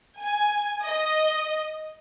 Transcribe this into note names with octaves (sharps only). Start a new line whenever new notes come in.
G#5
D#5